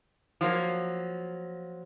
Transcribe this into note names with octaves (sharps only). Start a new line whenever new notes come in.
F3 F#3 A#3